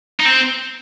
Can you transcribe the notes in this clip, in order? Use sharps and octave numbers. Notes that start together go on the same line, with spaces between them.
D#4
C4